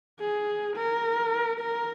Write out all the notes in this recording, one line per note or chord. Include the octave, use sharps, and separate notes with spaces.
G#4
A#4
A#4